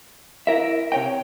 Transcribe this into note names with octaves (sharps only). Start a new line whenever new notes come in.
E4 A#4 E5
C3 C#5 G5